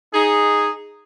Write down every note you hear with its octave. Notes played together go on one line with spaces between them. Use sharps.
D#4 G#4